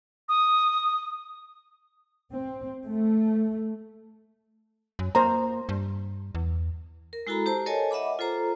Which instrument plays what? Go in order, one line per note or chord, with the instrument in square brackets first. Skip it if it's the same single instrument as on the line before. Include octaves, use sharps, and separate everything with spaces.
[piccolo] D#6
[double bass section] C4
A3
[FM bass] F#2
[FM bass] A#3 [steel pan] C5 A#5
[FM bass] G2
E2
[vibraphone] A#4
G#3 E4 F#4 A4 A#5 B5
G4 C5 A5 A#5
A4 A#4 C#5 D#5 G#5 A5
D#5 E5 F#5 B5 D6
F4 A4 C5 A#5